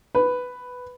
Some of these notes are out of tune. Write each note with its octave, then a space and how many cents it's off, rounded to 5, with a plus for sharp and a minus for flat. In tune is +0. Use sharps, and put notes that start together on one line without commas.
B4 +5